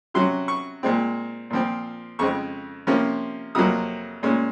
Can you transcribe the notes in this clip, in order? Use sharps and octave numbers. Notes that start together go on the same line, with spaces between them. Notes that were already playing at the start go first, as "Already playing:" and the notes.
C3 F#3 C#4 C6
C#6
A#2 G#3 C4
A#2 F3 C4
F2 C#3 G#3 C4 C#6
C3 F3 A#3 C#4
F2 C3 F#3 A#3 D#6
A#2 G#3 C#4